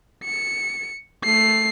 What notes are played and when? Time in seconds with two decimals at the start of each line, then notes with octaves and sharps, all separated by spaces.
0.24 C#7
1.25 A3 C7